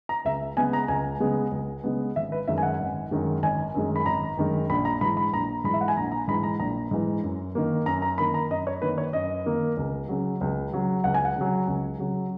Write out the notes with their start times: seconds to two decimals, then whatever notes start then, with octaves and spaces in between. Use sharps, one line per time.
0.09 A#5
0.25 C#2 E5
0.57 C#3 G#3 B3 G#5
0.73 A#5
0.88 C#2 G#5
1.20 C#3 G#3 B3
1.51 C#2
1.84 C#3 G#3 B3
2.16 G#1 E5
2.32 B4
2.48 F#2 D#3 G#3 E5
2.58 G#5
2.63 F#5
2.80 G#1
3.11 F#2 D#3 G#3
3.43 G#1 G#5
3.75 F#2 D#3 G#3
3.96 B5
4.06 G#1 A#5
4.37 F#2 D#3 G#3
4.70 A#1 B5
4.85 A#5
5.01 G#2 E3 B5
5.17 B5
5.33 A#1 A#5
5.64 G#2 E3 B5
5.73 E5
5.81 F#5
5.88 G#5
5.97 A#1 A#5
6.12 A#5
6.28 G#2 E3 B5
6.43 A#5
6.60 A#1 A#5
6.91 G#2 E3
7.23 F#2
7.55 D#3 A#3
7.86 F#2 A#5
8.02 A#5
8.18 D#3 A#3 B5
8.34 A#5
8.50 F#2 D#5
8.67 C#5
8.82 D#3 A#3 B4
8.98 C#5
9.13 F#2 D#5
9.46 D#3 A#3
9.77 C#2
10.09 C#3 F#3
10.41 C#2
10.73 C#3 F#3
11.04 C#2 F#5
11.14 G#5
11.25 F#5
11.36 C#3 F#3
11.68 C#2
11.99 C#3 F#3